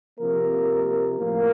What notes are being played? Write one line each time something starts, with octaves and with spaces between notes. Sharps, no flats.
C3 F3 A#3 A#4
A2 F3 A#3 A#4